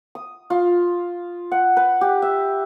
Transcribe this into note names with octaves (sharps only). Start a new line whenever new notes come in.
D#6
F4
F#5
B4
G4
E5